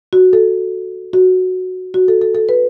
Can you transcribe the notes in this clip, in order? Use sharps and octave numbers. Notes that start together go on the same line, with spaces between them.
F#4
A4
F#4
F#4
A4
A4
A4
B4